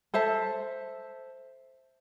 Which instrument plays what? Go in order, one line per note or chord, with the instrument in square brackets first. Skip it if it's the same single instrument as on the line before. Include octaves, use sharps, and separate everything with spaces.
[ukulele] A4 C5 E5 A5